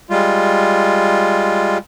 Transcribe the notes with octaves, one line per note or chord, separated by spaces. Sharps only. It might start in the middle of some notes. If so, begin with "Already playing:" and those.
G3 G#3 F4